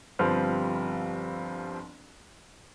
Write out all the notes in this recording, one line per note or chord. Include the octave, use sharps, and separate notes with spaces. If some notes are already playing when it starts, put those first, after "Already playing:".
G1 F3 G3 C4 B4 F6